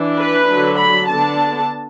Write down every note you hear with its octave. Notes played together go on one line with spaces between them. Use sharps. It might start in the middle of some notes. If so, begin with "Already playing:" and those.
Already playing: E3 D4
B4
D3 F#3 D4
B5
D3 B3 D4 A5